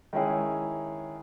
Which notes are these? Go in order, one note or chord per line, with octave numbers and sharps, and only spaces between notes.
D#3 G#3 C#4 E4 G#4